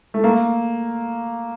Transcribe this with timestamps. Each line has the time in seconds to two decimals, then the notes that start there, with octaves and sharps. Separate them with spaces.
0.14 A3
0.24 A#3